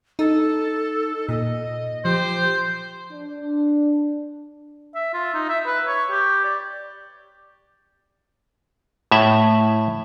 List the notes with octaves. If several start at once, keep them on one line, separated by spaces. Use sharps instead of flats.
D#4 A4
A#2 D#5
F3 G4 C5
D4
E5
F4
D#4
E5
B4
C#5
G4
D5
A2 E5